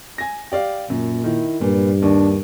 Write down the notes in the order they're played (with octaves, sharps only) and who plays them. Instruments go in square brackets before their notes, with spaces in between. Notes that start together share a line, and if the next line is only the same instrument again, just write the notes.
[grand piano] G#5 A#6
G4 D5 F5
[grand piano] F#2 [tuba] A#2
[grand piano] D#3 [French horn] E4
[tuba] G2 [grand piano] A#2 [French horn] B4
[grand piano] D#2 [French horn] D4